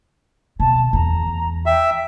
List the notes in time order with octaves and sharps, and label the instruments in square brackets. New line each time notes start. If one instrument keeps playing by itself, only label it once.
[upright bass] B2 [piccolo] A5
[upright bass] E2 [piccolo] A#5
[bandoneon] E5 [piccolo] G5